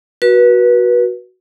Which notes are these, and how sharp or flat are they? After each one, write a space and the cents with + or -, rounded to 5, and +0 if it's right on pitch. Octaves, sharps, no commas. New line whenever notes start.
F#4 +0 B4 -30